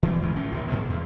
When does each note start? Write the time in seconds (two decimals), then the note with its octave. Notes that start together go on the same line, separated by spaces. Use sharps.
0.03 E3 F#3 A3 C4
0.21 D2 G#2 C3 E3
0.36 A#1 A2 F3 C#4
0.52 A#1 D#2 E3
0.69 G#2 B2 F3 B3
0.90 E2